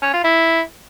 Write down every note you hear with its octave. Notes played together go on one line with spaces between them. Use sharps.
C#4
F4
E4